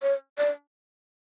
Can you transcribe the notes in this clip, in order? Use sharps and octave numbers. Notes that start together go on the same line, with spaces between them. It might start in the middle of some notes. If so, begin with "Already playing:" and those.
C#5
D5